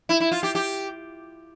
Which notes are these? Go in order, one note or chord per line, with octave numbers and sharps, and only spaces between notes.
E4
E4
F4
G4
G4